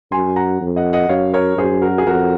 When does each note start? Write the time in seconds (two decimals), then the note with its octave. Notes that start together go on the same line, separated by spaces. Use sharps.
0.12 F#2 G#5 C6
0.36 F#5 A#5
0.61 F2
0.76 D#5 F#5
0.93 D#5 F#5
1.09 F#2 C#5 F5
1.34 A#4 C#5
1.58 F#2 G#4 C5
1.82 F#4 A#4
1.98 G#4
2.07 F2 F#4 A#4